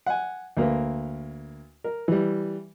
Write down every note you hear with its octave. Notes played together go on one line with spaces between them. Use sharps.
F#5 G#5
D2 A#3 A#4 B4
A#4
E3 G3